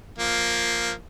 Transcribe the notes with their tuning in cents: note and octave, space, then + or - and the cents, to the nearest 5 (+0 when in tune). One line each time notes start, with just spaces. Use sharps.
F3 +0 A#3 +0